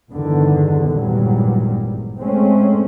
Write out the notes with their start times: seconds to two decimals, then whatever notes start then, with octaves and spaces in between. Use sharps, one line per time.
0.12 E2 G2 D3 D#3
0.89 G#1 E2 G2 A#2 F#3 G3
2.17 G#3 A3 C4 C#4